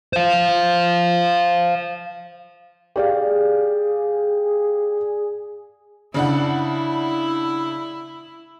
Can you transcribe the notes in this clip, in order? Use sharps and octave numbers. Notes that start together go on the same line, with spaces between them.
C5 F5
G4 G#4 D5 F5
C#3 D4 E4 F#5